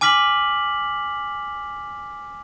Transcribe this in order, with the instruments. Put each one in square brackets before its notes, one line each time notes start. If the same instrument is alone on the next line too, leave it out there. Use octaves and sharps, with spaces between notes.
[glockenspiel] G#5 D6 F6 B6 F#7